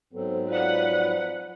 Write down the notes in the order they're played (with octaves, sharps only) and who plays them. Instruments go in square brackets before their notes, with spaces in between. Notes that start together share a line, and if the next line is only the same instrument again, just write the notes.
[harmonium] G#2 F#3 C4 [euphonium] B3 [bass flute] A4
[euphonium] F4 [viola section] B4 F#5 [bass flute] D5
[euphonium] F3